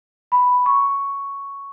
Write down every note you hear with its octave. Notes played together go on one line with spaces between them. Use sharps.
B5
C#6